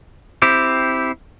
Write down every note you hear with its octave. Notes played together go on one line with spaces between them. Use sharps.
C4 E4 G4